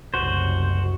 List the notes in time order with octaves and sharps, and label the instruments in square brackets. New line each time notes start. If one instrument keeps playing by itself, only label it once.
[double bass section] F#1 C2 F#2 [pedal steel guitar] F#4 C5